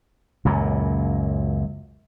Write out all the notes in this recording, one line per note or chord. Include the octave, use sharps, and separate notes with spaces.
C#2 F#2 A#2